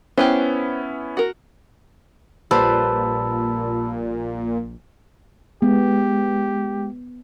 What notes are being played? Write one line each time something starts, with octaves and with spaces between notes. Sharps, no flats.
B3 C#4 E4 G4 B4 C5
F#4 A#4
A#1 A#2 G3 B4 C5 A5 B5 E6
G#3 B3 G4